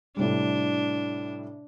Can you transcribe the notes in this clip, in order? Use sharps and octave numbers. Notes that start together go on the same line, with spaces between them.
A2 C3 G3 D4